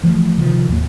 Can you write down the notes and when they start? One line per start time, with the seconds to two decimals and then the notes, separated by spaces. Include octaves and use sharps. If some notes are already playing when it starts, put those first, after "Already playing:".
0.03 E3 F3 A3
0.38 C3 D#3 F3
0.69 D#2 A2 A#3